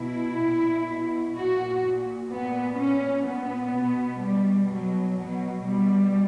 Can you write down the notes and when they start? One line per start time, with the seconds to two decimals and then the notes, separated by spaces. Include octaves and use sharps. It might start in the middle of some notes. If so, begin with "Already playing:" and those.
Already playing: B2 E4
0.42 A#2
0.89 B2
1.37 A#2 F#4
1.85 A#2
2.32 A#2 B3
2.79 A#2 C#4
3.27 A#2 B3
3.75 B2
4.22 B2 G3
4.70 B2 F#3
5.18 B2 F#3
5.66 B2 G3